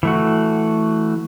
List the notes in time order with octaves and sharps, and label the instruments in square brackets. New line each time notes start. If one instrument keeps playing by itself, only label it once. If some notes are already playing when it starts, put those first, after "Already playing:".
[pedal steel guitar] E3 A3 F#4